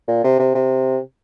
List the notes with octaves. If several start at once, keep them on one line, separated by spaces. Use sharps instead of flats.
A#2
C3
C3
C3